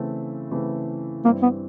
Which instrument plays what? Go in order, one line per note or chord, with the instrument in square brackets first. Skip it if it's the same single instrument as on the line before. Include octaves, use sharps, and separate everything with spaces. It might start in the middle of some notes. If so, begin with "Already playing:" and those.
Already playing: [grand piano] C#3 E3 A3 C4
C#3 E3 A3 C4
[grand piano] G2 E3 G3 C4 E4 [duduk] A#3
[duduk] B3